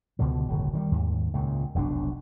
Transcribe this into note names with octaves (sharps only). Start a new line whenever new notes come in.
C#2 B2 D3 F3
D1 G1 F#2 C#3
D#3 F#3 G3
D#2 G#2
C#2 A#2 C#3
F1 B1 F#2 D4